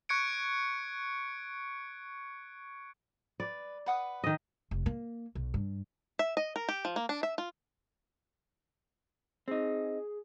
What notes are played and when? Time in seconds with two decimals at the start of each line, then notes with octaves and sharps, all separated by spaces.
0.09 C#6 F#6 G#6 C#7 D7
3.40 B4 D5
3.86 B4 F#5 D#6
4.24 D#3 D#5
4.71 F1
4.86 A#3
5.35 B1
5.54 G2
6.19 E5
6.37 D#5
6.56 A#4
6.69 G4
6.85 F3
6.96 A#3
7.09 D4
7.23 E5
7.38 F4
9.48 C4 D#4 G#4